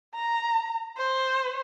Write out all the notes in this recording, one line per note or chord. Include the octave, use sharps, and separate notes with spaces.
A#5
C5